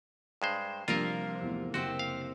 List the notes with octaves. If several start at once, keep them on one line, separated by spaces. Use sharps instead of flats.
G2 G#3 C5
C3 F3 G3 A#3 D4 F4 A#4
E2 A2
F#1 C4 F#4 G4
F5